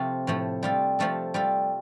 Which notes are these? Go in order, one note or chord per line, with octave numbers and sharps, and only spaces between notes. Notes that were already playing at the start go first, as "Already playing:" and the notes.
Already playing: C3 F3 A3 C4 F4
A2 F3 A3
G3 F4 A4
F3 A3 F4 A4
G3 F4 A4